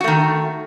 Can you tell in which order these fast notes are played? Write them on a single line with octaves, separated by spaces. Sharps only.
F#4 A3 D#3